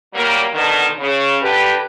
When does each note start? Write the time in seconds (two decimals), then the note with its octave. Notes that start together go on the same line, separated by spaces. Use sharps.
0.14 A#2 F#3 G3 A#3
0.53 B2 D3 D#3
0.99 C#3
1.42 D3 G4 B4